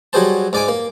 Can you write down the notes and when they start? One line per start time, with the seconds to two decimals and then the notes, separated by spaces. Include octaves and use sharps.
0.13 F#3 G3 F#4 G#4 C5 A5
0.53 G#2 D5 G#5 D6
0.68 A#3